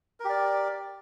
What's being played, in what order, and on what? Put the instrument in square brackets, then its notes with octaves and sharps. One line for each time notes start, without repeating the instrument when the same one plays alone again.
[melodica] A#4
G4
D5